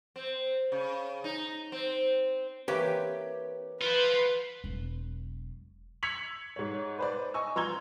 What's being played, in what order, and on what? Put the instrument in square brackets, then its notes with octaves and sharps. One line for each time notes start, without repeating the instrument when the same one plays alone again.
[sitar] C4
C#3
D#4
C4
[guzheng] E3 A#3 C4 [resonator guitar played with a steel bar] G4 B4 C#5
[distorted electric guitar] F4 C5 [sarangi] B4
[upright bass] E1 F#3
[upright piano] E6 G#6 B6 C#7 F7 F#7
G#2 C#5
B4 C5 D5
D#5 G#5 C#6 E6
F3 A#5 C6 E6 G#6 G7